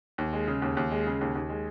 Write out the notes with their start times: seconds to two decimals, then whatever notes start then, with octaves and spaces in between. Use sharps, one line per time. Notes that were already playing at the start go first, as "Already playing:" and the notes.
0.18 D#2
0.33 G#3
0.48 C#3
0.62 D#2
0.77 D#2
0.91 G#3
1.06 C#3
1.21 D#2
1.36 D#2
1.49 G#3